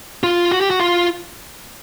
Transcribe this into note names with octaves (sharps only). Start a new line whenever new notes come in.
F4
F#4
G4
F#4
F4